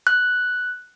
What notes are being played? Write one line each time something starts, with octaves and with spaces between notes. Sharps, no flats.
F#6